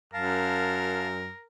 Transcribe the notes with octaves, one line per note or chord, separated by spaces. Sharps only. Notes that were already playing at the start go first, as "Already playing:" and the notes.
F#2 A#4 F5 A5